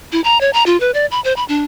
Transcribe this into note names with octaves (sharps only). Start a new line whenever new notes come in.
E4
A#5
C#5
A#5
F4
B4
D5
B5
C5
B5
D4